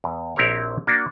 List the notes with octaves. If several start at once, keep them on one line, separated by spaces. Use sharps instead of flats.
E2
A#1 C4 E4 G4 A#4 C#5
A#3 D4 F#4